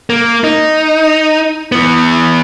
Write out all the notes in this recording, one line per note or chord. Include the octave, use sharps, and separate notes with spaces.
A#3
D#4
E3 B3